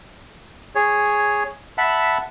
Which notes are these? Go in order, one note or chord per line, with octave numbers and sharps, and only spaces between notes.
G#4 C#5
E5 F#5 A5 B5